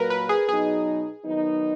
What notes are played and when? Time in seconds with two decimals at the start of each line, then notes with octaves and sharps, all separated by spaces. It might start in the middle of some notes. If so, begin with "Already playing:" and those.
Already playing: A#2 F#3 A#3 A#4 B4
0.10 B4
0.29 G#4
0.49 B2 F#3 B3 D#4 G#4
1.24 D#3 F#3 B3 D#4